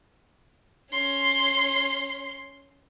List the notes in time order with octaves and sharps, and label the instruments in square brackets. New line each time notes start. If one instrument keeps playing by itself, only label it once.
[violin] C#4 C6